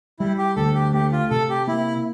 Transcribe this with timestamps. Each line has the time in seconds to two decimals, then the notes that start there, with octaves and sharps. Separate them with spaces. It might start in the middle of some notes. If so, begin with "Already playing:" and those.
0.19 G3 E4
0.38 G4
0.56 D2 A4
0.75 G4
0.93 A3 G4
1.12 F4
1.30 C3 A4
1.50 G4
1.67 A#3 E4